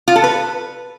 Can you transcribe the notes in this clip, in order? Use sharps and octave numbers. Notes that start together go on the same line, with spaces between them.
F4
A4
B4